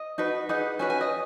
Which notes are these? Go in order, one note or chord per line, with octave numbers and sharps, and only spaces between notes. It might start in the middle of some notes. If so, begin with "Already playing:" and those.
Already playing: D#5
D#4 F#4 B4
D#4 G#4 B4 F#5
C#4 F#4 B4 G#5
G#5
D#5